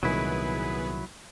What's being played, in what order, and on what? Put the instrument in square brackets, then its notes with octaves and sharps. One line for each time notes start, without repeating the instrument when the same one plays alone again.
[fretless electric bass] C2 A#2 D#3 [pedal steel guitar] F#3 E4 [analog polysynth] B3 G#4 B4